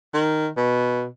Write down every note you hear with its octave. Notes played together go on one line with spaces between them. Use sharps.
D#3
B2